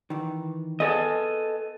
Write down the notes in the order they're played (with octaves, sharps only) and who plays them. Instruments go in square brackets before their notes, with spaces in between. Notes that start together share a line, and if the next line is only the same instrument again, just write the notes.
[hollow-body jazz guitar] D#3 E3
[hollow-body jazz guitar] B3 G#4 [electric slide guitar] A4 D#5